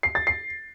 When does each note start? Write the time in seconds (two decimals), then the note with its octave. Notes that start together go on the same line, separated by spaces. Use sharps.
0.03 C7
0.15 A6
0.27 C7